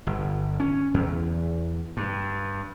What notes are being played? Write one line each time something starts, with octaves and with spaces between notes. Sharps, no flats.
G1
C#4
E2
G2